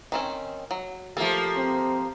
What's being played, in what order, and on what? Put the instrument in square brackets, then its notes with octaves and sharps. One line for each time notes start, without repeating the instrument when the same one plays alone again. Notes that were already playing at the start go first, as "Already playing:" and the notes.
[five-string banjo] D#3 C4 C#4
F#3
[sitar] F3 A#3 [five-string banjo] A3 A4 [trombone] G4
[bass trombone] C4